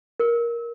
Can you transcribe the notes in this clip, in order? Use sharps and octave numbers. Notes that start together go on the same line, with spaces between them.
A#4